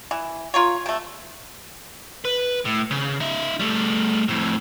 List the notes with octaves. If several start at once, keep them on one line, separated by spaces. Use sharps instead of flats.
E3
F4 A#4 C#5
C3 A3
B4
A2
C#3
D#4 E5
G3 A3
F2 A2